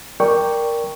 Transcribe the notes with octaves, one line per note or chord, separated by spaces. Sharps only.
A#4 D5 G5 C#6